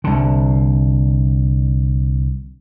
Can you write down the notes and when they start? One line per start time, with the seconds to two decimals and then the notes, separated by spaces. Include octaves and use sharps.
0.04 C2 D3